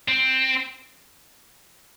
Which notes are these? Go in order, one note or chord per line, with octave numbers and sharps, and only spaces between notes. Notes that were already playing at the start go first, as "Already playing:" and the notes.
C4